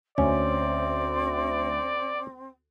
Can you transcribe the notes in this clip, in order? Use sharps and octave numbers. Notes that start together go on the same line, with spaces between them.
D2 C4 C#4 D5